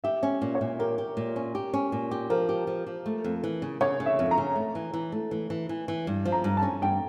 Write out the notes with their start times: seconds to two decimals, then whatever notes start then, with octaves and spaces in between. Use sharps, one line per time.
0.04 G4 E5
0.23 C#4
0.42 A#2
0.55 C#5
0.61 A#2
0.79 G4 A#4
0.98 G4
1.17 A#2
1.36 C#4
1.55 G4
1.74 C#4
1.92 A#2
2.11 G4
2.30 F3 A#4
2.49 G4
2.67 F3
2.87 F3
3.06 A3
3.24 F2
3.44 E3
3.62 C#3
3.81 C#3 C#5
4.00 C#3
4.06 E5
4.19 F2
4.31 A#5
4.38 C#3
4.56 A3
4.75 E3
4.94 E3
5.12 A3
5.31 E3
5.50 E3
5.69 E3
5.88 E3
6.07 G2
6.25 F3
6.32 A#5
6.44 G2
6.57 A5
6.63 C#4
6.82 G2 G5